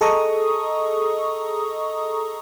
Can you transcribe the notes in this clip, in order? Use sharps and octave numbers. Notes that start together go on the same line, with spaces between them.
G#4 A4 D#5 A#5 C#6 D#6